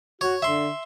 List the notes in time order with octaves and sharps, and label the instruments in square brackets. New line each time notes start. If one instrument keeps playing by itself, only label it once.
[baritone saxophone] F#4 [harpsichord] C#5
[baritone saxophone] D3 [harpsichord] E5 C6